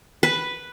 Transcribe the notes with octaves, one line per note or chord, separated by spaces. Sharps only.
B4